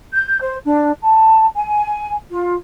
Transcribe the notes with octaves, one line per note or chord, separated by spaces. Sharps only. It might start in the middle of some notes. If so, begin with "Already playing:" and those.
G6
C5
D4
A5
G#5
F4